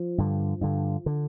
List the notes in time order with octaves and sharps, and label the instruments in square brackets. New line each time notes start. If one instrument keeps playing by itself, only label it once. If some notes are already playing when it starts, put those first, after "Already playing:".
Already playing: [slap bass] F3
G2 D3
G2 D3
D3